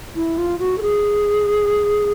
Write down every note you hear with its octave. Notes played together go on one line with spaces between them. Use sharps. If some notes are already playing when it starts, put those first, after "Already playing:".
E4
F4
F#4
A4
G#4